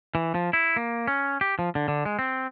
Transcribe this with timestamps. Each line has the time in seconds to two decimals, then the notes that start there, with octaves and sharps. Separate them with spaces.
0.15 E3
0.35 F3
0.53 E4
0.76 A#3
1.08 C#4
1.41 G4
1.59 F3
1.75 D3
1.88 D3
2.05 G#3
2.19 C4